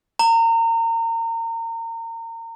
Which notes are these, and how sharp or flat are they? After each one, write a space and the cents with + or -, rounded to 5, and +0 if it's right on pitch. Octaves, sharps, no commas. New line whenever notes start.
A#5 -30